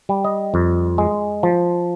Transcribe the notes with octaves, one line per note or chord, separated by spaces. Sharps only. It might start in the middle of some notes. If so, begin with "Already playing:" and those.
G3
D#5
F2
G#3
F3